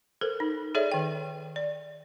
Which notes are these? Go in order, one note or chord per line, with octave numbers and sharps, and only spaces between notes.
A4 A#4 C5
D#4
G#4 A4 C#5 D5 E5
D#3 G5
D5